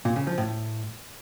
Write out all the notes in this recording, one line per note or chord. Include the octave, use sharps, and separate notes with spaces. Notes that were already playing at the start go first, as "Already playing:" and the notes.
A#2
C#3
F3
A2